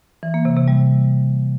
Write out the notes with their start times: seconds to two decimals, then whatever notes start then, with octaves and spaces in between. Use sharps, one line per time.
0.23 E3
0.34 A#3
0.45 C3
0.56 C3
0.68 G3